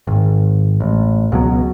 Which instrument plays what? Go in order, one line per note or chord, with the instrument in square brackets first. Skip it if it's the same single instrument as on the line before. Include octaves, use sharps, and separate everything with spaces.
[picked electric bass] G#1
A1
C#2 B2 F#3